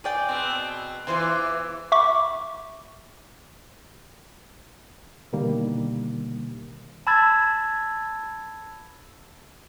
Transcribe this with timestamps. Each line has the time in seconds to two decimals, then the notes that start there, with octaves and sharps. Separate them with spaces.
0.04 G#4 D5 G5
0.28 B2 C4
1.07 E2 E3 F4 C5 D5
1.92 E5 B5 C#6 D6
5.33 B2 D3 D#3 G3 A#3
7.07 A5 B5 E6 G#6 A6